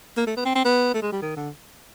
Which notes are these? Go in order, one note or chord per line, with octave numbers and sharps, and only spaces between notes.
A#3
A3
B3
C4
C4
B3
A3
G#3
G3
D#3
D3